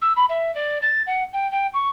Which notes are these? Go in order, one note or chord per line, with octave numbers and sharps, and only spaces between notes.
E6
B5
E5
D5
A6
F#5
G5
G5
C#6